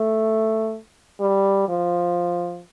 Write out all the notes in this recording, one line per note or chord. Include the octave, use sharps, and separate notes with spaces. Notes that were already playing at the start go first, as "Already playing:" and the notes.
Already playing: A3
G3
F3